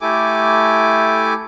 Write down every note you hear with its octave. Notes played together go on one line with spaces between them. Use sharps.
A3 E4 G4 A4 G#5 D6